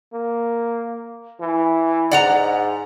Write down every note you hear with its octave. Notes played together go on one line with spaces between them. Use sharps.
A#3
E3
G#2 D5 F#5 A#5